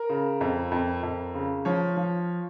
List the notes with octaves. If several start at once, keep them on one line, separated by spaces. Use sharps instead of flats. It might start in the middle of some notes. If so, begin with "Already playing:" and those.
Already playing: A#4
C#3
F2
F2
F2
C#3
F3 C#5
F3